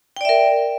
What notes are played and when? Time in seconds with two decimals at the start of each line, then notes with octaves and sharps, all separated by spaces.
0.17 G5
0.21 D5
0.25 E5
0.29 A#4